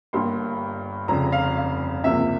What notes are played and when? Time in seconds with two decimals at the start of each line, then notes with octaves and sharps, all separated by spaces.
0.13 G1 G2 G3 A#3 C6
1.08 F1 F2 C#3 F3 A#5
1.32 F5
1.57 F5
2.04 C#2 C3 F3 A#3 E5